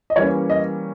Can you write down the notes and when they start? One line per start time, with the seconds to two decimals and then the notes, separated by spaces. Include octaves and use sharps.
0.10 D#5
0.16 E3 G3 A#3 C#4 C#5
0.50 D#5